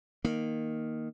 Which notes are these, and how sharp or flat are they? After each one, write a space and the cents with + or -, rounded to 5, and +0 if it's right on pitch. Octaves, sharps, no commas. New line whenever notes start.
D#3 +0 A#3 +0